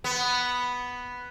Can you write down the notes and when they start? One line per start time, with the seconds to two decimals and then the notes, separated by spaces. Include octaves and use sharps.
0.04 B3